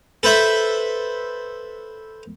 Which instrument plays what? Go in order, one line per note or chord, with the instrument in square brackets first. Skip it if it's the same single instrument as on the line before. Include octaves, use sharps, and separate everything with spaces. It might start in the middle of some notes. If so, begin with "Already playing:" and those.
[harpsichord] A4 B4 C5 E5